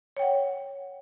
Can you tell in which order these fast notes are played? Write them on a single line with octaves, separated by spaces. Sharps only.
C#5 G5 F#5